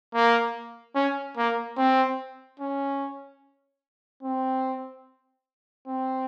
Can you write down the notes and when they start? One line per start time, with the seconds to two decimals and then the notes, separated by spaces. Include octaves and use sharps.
0.14 A#3
0.95 C#4
1.37 A#3
1.77 C4
2.60 C#4
4.23 C4
5.87 C4